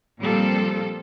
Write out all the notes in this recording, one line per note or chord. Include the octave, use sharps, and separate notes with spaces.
A#2 F3 G3 C4 A4